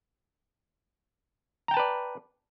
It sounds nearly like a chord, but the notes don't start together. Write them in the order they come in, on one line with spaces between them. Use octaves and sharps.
A#5 G5 A5 B4 D5